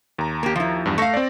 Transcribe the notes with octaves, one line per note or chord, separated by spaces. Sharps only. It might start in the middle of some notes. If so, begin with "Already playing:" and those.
D#2 A#5
A#3 G4
F3 E4
E2 G2
A3 F5 C#6 A#6
C4 D5